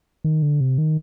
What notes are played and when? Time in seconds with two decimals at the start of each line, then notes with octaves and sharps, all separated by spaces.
0.24 D#3
0.42 D3
0.61 C3
0.78 D#3